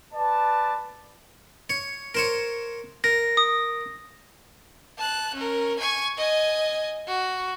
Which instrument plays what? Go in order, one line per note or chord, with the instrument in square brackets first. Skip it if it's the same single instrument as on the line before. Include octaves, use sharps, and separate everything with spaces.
[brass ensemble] B4 D5 A5
[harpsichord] C#5
A#4 C5 C#5
[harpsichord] A#4 [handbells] A#6
[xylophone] D#6
[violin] A5 F#6
C#4 A#4
G#5 C#6
D#5 G#5
F#4